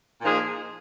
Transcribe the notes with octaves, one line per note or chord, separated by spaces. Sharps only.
A#2 F3 A#3 D#4 G#4